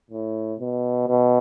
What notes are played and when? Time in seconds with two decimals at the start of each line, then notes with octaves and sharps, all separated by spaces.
0.11 A2
0.59 B2
1.08 B2